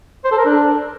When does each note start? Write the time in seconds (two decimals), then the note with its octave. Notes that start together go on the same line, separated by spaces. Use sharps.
0.25 C5
0.31 A4
0.38 A#4
0.45 D4